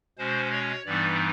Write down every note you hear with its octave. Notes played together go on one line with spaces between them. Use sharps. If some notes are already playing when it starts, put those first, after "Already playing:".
B2 G#3 C#4 C5
C#5
G2 E3 G3 B3 D#4 D5